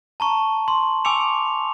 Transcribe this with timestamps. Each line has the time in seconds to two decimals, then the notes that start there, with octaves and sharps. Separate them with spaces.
0.20 A5 A#5 C#6
0.68 C6
1.05 G#5 C#6 D6 E6 C#7 F7